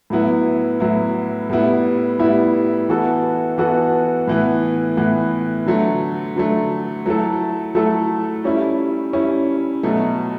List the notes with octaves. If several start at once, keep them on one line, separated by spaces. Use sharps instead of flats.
A2 F#3 B3 E4
A2 F#3 B3 E4
A2 G3 B3 E4
A2 G3 B3 E4
E3 B3 F#4 A4
E3 B3 F#4 A4
A2 E3 B3
A2 E3 B3
D3 F#3 A3
D3 F#3 A3
F#3 A3 E4 A4
F#3 A3 E4 A4
G3 C#4 E4
G3 C#4 E4
B2 F#3 A3